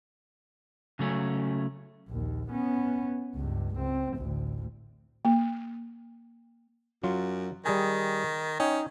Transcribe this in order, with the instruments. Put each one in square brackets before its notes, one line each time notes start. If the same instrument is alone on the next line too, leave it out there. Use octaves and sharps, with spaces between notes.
[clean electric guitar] C#3 F#3 A3 C#4
[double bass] A#1 D#2
B3 C#4
C#2 G2
C#2 C4
A1 D2
[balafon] A#3
[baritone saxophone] F#2 [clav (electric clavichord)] F#3 F4
[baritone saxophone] D#3 [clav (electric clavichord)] G3 G#4 G#5
[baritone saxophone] C#4 [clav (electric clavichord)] D#4 G5